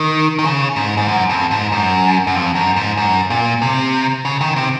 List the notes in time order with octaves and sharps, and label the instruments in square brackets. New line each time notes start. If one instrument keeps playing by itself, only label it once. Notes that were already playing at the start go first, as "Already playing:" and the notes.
Already playing: [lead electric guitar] D#3
D#3
C#3
G#2
G#2
F#2
F2
G#2
F#2
F#2
F2
F#2
G#2
F#2
A#2
C3
C#3
D#3
C3